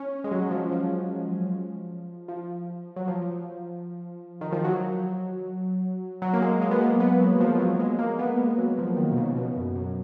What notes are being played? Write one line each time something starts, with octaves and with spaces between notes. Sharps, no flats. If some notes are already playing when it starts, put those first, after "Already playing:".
Already playing: C#4
G#3
F#3
F3
F3
F3
F#3
F3
D#3
F3
F#3
F#3
A#3
G#3
G#3
B3
A#3
B3
F#3
F3
F3
F#3
G#3
A#3
B3
G#3
F#3
F3
D#3
B2
C#3
B2
F#2
F#2